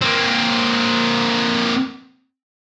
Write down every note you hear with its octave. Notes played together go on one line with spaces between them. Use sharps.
A#3 C4